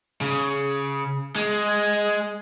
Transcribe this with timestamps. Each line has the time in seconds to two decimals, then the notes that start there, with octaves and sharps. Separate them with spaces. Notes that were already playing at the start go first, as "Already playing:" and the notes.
0.21 C#3
1.36 G#3